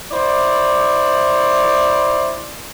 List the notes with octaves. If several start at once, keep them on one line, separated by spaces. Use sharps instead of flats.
E4 C5 D5